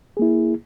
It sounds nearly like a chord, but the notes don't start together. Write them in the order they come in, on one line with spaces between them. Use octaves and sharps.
G#4 A#3 E4